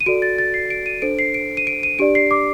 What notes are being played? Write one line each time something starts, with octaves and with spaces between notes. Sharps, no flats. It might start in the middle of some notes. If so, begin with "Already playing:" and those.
D#7
F#4 A4 D5 D7
A6
A6
C7
D7
D#7
D4 A4 C5 D7
C7
D7
D#7
D7
D#7
D4 G4 D5 D7
C7
D6